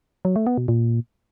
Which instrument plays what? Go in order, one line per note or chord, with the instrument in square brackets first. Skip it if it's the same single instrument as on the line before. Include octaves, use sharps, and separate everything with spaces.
[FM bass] F#3
A3
B3
B2
A#2